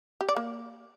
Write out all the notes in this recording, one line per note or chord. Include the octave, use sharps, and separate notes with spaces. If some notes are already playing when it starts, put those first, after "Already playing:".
G4
D5
A#3